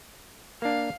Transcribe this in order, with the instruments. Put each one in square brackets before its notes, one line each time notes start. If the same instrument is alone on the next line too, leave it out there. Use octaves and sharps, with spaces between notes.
[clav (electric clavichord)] A#3 D4 [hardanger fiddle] F5